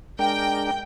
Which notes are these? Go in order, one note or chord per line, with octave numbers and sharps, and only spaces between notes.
G#3 D4 A#4 G5